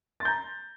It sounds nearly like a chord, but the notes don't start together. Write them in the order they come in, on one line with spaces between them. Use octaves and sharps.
A6 C6 G6 A#5